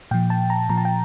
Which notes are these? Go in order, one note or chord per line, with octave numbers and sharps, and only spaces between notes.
A#2 F3 G5
A5
A#5
A#2 F3 A#5
A5
G5